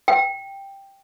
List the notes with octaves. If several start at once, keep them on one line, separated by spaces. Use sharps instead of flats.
G5